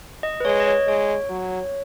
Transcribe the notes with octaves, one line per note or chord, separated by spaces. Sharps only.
D#5
B4
G#3 C#5
D#5
C#5
G#3 C#5
F#3